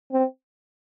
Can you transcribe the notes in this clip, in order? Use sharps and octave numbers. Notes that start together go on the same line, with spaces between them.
C4